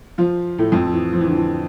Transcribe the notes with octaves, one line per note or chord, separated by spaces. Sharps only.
F3 F4
A2 A3
F2 F3
F3
E3
F3
E3
D3
E3